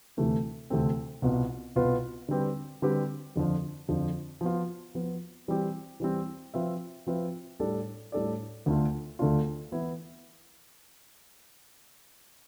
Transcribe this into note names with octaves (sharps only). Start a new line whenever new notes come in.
D2 C3 E3 A3 C4
D2 C3 E3 A3 C4
C2 B2 B3 F4 B4
C2 B2 B3 F4 B4
D3 G3 C4 G4 B4
D3 G3 C4 G4 B4
F2 D3 F3
F2 D3 F3
F3 B3 F4
F3 B3 F4
E3 G3 C4 G4
E3 G3 C4 G4
F3 C4 F4 B4 E5
F3 C4 F4 B4 E5
A2 G3 D4 A4 D5
A2 G3 D4 A4 D5
D2 D3 A3 D4 F4
D2 D3 A3 D4 F4
E3 B3 E4